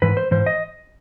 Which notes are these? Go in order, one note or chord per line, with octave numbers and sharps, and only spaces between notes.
G#2 E3 B4
C5
G#2 E3 C5
D#5